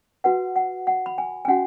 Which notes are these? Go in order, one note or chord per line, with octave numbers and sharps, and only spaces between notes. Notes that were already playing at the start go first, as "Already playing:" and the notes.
F#4 B4 F#5
F#5
F#5
B5
G#5
G#5
C#4 F#4 F#5